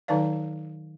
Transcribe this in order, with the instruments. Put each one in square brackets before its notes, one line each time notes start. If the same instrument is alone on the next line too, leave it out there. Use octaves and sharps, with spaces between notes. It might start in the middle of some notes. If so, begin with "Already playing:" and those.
[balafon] D#3 F#3 D#4 B4 D5 F5